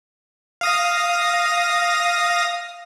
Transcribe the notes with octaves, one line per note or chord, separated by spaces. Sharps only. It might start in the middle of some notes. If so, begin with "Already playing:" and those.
F5 D#6 A#6